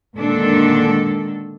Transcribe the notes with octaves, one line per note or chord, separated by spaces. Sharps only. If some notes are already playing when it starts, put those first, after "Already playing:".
A#2 D3 D#3 G#3 D4 A4